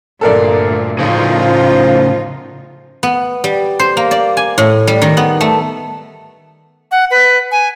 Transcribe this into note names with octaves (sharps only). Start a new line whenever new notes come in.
D2 G2 A#2 A4 A#4 D5
A2 C#3 F3 D#4 F4
B3
G3
C5
A#3
D5
G#5
A2
G3
D#3
B3
A3
F#5
B4
G#5